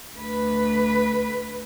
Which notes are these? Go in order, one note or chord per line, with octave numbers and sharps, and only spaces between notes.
D2 B4